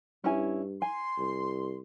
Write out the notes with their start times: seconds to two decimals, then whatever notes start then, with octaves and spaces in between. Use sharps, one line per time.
0.24 G2 C#4 E4 G#5
0.82 G#5 C6
1.18 C2